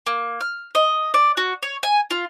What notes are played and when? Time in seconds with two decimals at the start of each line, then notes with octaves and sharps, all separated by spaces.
0.07 A#3
0.41 F6
0.75 D#5
1.14 D5
1.37 F#4
1.63 C#5
1.83 G#5
2.11 F4